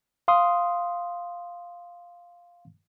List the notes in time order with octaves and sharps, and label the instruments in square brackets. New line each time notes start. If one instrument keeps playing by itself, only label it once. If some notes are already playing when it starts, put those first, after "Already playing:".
[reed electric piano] F5 C6 D#6